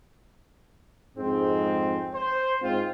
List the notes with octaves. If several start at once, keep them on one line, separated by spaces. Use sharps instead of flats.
F2 G#2 G#3 C4
C5
G#2 C4 F4